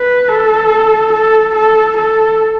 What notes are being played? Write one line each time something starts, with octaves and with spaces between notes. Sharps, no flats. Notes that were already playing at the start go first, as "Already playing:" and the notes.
Already playing: B4
A4
A4
A4
A4